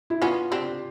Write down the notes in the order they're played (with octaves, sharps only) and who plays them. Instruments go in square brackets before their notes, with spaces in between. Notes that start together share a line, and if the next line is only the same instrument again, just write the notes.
[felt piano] E4
[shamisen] B3 C#4 [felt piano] F4
[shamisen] C4 D4 [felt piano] G4